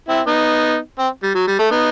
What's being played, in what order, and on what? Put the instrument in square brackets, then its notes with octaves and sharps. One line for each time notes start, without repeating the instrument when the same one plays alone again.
[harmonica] C4 E4
B3 D#4
C4
G3
F#3
G3
A3
B3 D#4